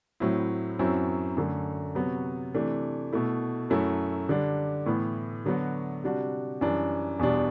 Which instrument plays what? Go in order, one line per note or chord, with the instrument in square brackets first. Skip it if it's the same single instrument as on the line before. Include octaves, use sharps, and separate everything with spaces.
[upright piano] A2 F#3 C4 E4
F#2 F#3 C4 E4
F#2 D3 A3
C3 F#3 B3 F#4
C3 E3 A3 D4
B2 A3 E4
F#2 F#3 A3 E4
D3 G3 D4
A2 E3 B3
D3 F#3 B3 F#4
C3 G3 D4 F#4
F#2 E3 G3 D4
E2 B2 G3 D4